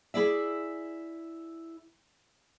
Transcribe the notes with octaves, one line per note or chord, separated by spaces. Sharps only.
E4 G#4 D5 E5